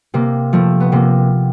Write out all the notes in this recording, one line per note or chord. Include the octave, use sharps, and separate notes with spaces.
C3 A#3
F3 A3
B3
C3 A#3